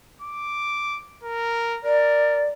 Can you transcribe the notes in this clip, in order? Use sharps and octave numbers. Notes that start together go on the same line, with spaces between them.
D6
A#4
A#4 D5